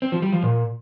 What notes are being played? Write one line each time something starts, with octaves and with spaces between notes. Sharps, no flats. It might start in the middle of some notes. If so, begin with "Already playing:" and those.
C4
F3
G3
F3
A#2